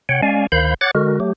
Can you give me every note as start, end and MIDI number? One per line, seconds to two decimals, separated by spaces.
0.09 0.21 48
0.09 0.21 73
0.09 0.21 78
0.09 0.21 79
0.22 0.47 56
0.22 0.47 61
0.22 0.47 74
0.22 0.47 77
0.22 0.47 80
0.52 0.74 38
0.52 0.74 51
0.52 0.74 72
0.52 0.74 77
0.52 0.74 83
0.52 0.74 91
0.81 0.91 73
0.81 0.91 78
0.81 0.91 86
0.81 0.91 90
0.81 0.91 93
0.95 1.19 50
0.95 1.19 56
0.95 1.19 66
0.95 1.19 70
1.20 1.33 54
1.20 1.33 57
1.20 1.33 67